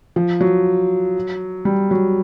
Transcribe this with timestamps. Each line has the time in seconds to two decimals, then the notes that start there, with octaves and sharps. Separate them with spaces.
0.16 F3
0.41 F#3
1.65 G3
1.91 F#3